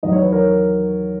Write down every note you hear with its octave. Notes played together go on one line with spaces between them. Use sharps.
E2 D#3 F#3 D#5
C#5
B4
A#4 C#5